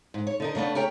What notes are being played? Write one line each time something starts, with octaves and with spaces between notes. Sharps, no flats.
G#2
C#5
D3 D#4 A#4
C#3 A3 B3 D4
G4 G#4 A#4 C#5 G5